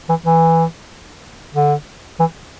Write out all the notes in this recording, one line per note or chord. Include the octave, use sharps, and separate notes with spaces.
E3
E3
D3
E3